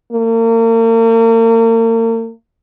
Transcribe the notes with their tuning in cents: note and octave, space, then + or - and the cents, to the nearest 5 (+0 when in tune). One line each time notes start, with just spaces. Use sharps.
A#3 -40